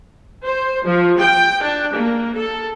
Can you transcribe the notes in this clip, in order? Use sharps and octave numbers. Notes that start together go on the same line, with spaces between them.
C5
F3
G5
D4
A#3
A4